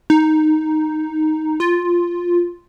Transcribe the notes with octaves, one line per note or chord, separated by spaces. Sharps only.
D#4
F4